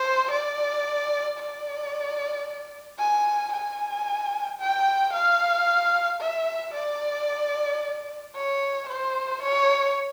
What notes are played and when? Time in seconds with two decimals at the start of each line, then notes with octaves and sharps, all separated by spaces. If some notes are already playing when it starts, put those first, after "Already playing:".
Already playing: C5
0.31 D5
1.38 D5
2.99 G#5
3.53 G#5
4.60 G5
5.13 F5
6.21 E5
6.74 D5
8.35 C#5
8.89 C5
9.42 C#5